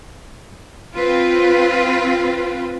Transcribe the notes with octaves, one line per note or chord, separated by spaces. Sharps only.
C4 F4 B4